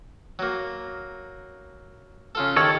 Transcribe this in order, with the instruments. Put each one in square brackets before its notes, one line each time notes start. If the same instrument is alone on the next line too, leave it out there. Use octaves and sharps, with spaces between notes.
[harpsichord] F#3 A#3
C#3 F4 A4
[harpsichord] D#3 G4 D5 [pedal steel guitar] A4 C#5